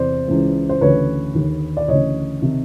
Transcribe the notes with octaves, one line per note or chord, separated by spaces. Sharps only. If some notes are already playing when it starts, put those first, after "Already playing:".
Already playing: E2 C3 C5 D5
C#2 C#3 E3
C5
D2 C#3 E3 B4 C#5
D#2 D3
D5
D2 C#3 E3 C#5 D#5
C3 D#3